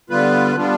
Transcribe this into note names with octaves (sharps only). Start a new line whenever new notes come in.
D3 G3 B3 F4 B4
G3 B3 D4 F4